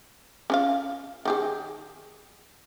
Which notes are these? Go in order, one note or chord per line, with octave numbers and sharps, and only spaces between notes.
C#4 F4 F5
D#3 G4 G#4